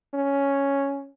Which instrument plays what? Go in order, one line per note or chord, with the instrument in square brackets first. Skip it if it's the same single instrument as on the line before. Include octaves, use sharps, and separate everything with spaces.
[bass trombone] C#4